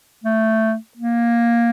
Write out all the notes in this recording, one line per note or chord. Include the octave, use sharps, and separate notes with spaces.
A3
A#3